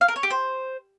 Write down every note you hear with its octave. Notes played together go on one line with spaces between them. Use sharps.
F5
A#4
C#5
G4
C5